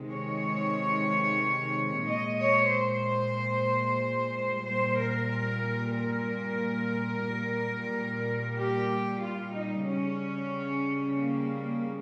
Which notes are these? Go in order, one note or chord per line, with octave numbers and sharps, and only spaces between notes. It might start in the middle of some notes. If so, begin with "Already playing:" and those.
Already playing: C3 D#3 G#3
C#5
A#2 G#3 D#5
C#5
C5
A#2 G3 C5
A#4
A#4
A#2 G3
G4
F4
D#4
C#3 G3 C#4
A#3